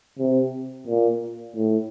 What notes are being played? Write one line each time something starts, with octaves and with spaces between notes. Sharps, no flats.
C3
A#2
A2